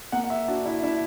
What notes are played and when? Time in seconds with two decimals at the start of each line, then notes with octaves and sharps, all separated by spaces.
0.12 A#3 F#5
0.24 F#5
0.30 E5
0.48 D4 F#4
0.66 E4
0.83 D4 E4